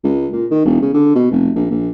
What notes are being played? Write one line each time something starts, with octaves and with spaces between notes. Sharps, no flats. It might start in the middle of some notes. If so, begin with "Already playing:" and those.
C#2
A#2
D#3
E1
C#3
D3
B2
F1
A#1
A#1